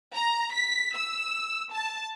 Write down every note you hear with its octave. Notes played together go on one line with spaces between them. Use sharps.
A#5
B6
E6
A5